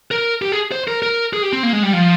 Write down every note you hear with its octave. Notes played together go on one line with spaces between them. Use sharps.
A#4
G4
G#4
C5
A#4
A#4
G#4
G4
C4
A#3
G#3
G3
F3